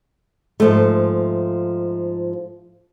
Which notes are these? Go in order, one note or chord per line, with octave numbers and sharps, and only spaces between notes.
G#2 F3 A3